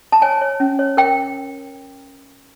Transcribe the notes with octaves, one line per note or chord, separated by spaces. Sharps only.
A5
C#5 G#5
C#5
C#4
C#5
A#4 G5